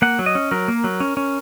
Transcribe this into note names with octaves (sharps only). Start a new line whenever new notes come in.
A#3 F#5
F#3
D#5
C#4
F#3 A#4
A#3
F#3
C#4
C#4